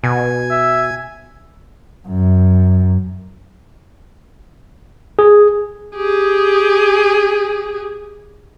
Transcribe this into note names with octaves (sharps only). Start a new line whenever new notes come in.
B2 G#5
E5
F#2
G#4
G4 G#4